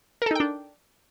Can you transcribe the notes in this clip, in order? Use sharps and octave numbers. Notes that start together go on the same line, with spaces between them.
D4 D#4 A4 A#4 G5